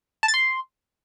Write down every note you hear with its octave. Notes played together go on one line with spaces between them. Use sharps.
A5
A6
C6